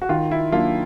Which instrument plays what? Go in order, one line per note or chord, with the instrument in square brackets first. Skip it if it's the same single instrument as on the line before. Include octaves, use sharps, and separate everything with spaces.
[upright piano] F#4
[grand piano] D#3 [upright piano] F4
[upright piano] E4
[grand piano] F#3 A#3 D4 [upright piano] F4